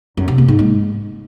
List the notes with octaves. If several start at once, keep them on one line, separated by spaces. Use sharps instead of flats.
F#2
C3
A#3
G#2
G#3